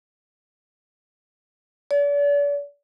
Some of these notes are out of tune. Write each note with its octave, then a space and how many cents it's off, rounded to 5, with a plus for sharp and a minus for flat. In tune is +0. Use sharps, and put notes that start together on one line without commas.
D5 -40